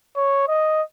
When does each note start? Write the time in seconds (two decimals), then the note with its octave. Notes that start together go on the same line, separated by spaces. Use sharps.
0.16 C#5
0.48 D#5